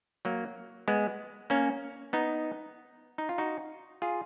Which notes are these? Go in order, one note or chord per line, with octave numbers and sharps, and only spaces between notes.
F#3 A#3
G#3 B3
A#3 C#4
B3 D#4
D#4
F4
D#4 F#4
F4 G#4